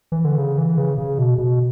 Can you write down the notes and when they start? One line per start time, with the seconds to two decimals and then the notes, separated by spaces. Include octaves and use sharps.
0.12 E3
0.25 D3
0.37 C#3
0.58 E3
0.78 C#3
0.98 C#3
1.18 B2
1.38 B2